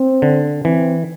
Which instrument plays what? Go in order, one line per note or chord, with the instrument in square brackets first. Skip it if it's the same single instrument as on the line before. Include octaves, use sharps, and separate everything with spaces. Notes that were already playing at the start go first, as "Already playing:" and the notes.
Already playing: [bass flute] C4
[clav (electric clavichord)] D3
[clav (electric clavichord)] E3 [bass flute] C4